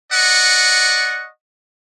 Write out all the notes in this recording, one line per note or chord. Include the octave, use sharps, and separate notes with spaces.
D5 D#5 F#5 C#6